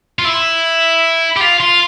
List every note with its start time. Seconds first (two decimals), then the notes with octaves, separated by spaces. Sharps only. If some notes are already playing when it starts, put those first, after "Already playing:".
0.19 F4
0.25 E4
1.37 G4
1.41 F4
1.60 F4